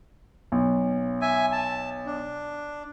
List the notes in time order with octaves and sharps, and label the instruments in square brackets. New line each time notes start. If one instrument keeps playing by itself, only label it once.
[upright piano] B1
[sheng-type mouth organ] E5 G#5
A5
D4